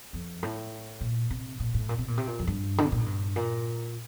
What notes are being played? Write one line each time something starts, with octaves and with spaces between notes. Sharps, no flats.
F2
A2
A#2
C3
A#2
A2
A#2
C3
A#2
C3
A#2
F2
G2
D3
C3
A#2
A2
G2
A#2